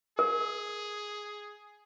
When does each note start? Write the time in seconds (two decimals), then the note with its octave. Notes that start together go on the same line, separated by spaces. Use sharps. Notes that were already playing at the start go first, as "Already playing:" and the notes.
0.19 G#4 A#4